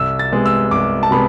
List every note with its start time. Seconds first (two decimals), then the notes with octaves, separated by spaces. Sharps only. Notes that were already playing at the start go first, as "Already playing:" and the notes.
Already playing: C2 E6
0.19 A6
0.32 C3 G#3 B3
0.46 E6
0.71 C2 D6
1.03 A5
1.11 C3 G#3 B3 B5